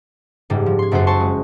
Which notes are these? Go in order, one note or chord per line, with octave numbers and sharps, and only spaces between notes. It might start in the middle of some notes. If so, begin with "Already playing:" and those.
F#1 G#2 G3
F3
C6 G#6
F#1 F#2 B3 F#4 C5
C5 A5 C6 C#6
G#3